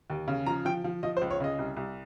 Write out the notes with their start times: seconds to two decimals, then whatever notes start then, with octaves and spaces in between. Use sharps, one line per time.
0.10 D#2
0.28 C#3
0.46 F3 A#5
0.65 F3 G5
0.84 F3
1.03 F3 D#5
1.17 C5
1.22 C#2
1.31 C#5
1.40 C#3 D#5
1.59 C2
1.77 C2